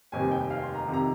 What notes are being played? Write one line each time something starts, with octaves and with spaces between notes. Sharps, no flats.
F1 D#2 D#3 G3 C4 G#5
G5
F5
C6
A#5
F2 C3 D#3
A#5